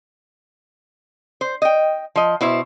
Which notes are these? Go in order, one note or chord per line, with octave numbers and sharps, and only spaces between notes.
C5
D#5 G5
F3 D#5
B2 E4 C5 E5